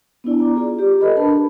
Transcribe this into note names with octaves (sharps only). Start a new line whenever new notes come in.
B3 D4 E4 D5
D5 A#5 D6
F4 G#4 D5
G4 D5
A4 B4 D#5 B5
D4 A#4 A5 B5